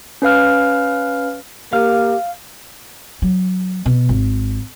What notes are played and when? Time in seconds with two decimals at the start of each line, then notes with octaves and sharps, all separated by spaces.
0.22 C#4 B4 F5 F6
1.73 A#3 G4 F5 F6
3.22 F#3
3.86 B2
4.09 G#1